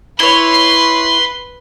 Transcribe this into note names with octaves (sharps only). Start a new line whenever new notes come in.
E4 B4 C#5 C6